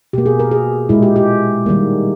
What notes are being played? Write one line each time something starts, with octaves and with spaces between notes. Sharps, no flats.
B2 A#3 G4
G#4
A#4
G#4
A#2 G#3 E4
G4
G4
D#3 G3 A#3